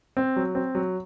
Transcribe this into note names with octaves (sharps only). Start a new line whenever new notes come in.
C4
F#3
C4
F#3